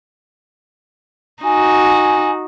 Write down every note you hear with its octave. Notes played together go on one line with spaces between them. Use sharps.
D#4 F#4 G#5